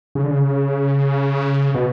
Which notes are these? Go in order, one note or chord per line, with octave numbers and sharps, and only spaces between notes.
C#3
D3
C#3
B2